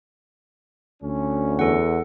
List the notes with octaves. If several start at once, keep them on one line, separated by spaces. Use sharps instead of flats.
D2 C#4
E2 A4 F#5